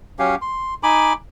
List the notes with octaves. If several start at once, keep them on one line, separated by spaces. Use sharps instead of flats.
F#3 C#4 G4 F5
C6
D#4 G#5 B5 D6